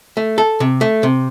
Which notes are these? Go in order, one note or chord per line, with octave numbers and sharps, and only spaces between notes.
A3
A4
C3
A3
C3